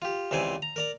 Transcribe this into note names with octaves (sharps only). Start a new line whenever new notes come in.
F4 G4
C#2 C3 E3 C5 D5 G#5
A#5
A#4 D5 A#5